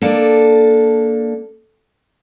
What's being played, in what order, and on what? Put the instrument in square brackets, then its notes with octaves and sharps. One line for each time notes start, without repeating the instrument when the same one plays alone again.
[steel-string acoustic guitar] A#3 D4 A4